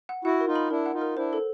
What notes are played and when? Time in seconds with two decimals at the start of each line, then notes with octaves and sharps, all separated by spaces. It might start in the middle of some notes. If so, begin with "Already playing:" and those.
0.09 F#5
0.24 E4 F#4 F#5
0.40 A#4
0.47 D#4 F4
0.55 B5
0.70 D4 E4 A#4
0.86 F#5
0.94 D#4 F4
1.01 A#4
1.17 D4 E4 C5
1.33 A4